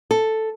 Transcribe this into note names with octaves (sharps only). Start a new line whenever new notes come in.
A4